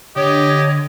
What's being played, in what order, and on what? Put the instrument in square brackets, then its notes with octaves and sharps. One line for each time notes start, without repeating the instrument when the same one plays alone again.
[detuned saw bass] D3 [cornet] G4 [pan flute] C#5 [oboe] D#5